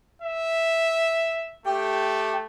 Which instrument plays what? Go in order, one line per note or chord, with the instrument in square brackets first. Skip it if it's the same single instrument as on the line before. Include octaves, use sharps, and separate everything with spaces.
[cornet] E5
[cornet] A3 [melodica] G4 G5